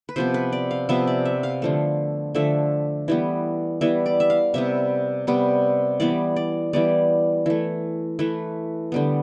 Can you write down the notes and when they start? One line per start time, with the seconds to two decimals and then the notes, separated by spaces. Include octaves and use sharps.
0.09 B4
0.16 C3 F3 B3 C5
0.34 B4
0.52 D5
0.71 F5
0.89 C3 F3 B3 E5
1.07 D5
1.25 E5
1.43 F5
1.62 D3 F3 A3
2.35 D3 F3 A3 E5
3.08 E3 G3 B3
3.81 E3 G3 B3 E5
4.06 D5
4.20 E5
4.30 F5
4.54 C3 G3 B3 E5
5.27 C3 G3 B3
6.00 E3 G3 B3 D5
6.36 D5
6.73 E3 G3 B3 D5
7.46 E3 A3
8.19 E3 A3 B4
8.92 D3 G3 B3